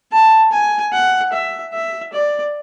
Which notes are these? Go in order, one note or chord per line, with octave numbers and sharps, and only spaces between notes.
A5
G#5
F#5
E5
E5
D5